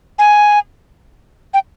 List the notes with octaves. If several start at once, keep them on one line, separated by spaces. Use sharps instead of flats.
G#5
G5